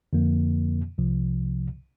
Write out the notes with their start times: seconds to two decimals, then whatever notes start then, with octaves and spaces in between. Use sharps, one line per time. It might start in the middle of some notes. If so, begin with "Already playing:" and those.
0.13 F2 D3 F3 A#3
0.98 C2 C3 F3